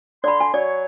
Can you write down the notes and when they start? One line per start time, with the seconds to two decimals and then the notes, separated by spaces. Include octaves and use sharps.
0.24 D3 D5 B5 C6
0.40 G#5
0.54 F#3 C#5 D5